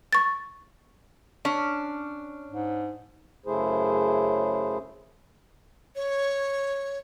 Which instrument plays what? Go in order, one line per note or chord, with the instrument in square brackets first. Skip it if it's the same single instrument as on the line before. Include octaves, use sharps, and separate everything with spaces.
[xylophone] C#6 A6
[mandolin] C#4 [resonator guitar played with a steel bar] D4
[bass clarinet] G#2
[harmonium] F#2 C#3 A3 E4 G#4 C5
[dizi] C#5